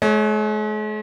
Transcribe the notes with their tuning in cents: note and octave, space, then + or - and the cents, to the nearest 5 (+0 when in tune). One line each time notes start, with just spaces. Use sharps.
G#3 +45 C#5 +0